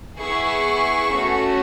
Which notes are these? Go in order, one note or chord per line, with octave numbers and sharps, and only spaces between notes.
B3 E4 G#4 C#6
A3 C#4 F#4